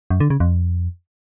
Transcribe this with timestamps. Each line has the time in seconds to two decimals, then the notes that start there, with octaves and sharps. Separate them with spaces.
0.10 F#2
0.20 D3
0.30 C#3
0.40 F2